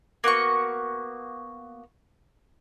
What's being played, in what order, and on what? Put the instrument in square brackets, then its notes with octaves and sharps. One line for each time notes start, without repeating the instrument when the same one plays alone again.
[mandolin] A#3 B3 F#4 C#6